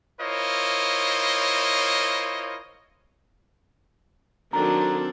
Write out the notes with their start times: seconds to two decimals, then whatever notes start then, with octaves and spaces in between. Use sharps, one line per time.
0.20 E4 F4 A#4 C5 C#5 D#5
4.53 D#3 F#3 C4 D4 A4 A#5